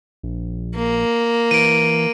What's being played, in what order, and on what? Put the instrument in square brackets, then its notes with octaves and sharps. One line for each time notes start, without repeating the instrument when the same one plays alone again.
[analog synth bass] A#1
[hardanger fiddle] A#3
[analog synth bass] E3 [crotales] D7 D#7